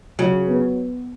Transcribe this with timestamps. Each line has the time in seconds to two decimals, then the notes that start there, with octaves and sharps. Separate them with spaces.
0.19 C#3 F#3
0.48 B3